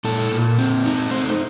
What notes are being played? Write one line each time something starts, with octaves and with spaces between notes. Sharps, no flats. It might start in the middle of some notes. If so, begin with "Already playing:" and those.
A#2 A4
A#2
C4
D#4
A3 C5